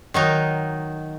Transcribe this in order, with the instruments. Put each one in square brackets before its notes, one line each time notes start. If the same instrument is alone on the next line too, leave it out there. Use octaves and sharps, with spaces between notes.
[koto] D#3 F#3 D#4